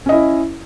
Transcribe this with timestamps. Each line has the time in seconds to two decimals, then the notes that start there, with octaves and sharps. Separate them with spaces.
0.06 C#4
0.09 D#5
0.12 E4